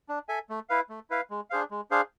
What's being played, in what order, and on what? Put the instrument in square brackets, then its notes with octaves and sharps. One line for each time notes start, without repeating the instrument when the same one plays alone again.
[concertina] D4
A4 E5 G#5
A3
E4 B4 F5
A3
E4 B4 F5
G#3
D4 G#4 C5 F5
G#3
D4 G#4 C5 F5